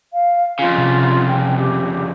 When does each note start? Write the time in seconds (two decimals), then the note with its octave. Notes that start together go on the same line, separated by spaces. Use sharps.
0.13 F5
0.59 F2 C#3 F4
0.78 C3
1.26 G5
1.58 G4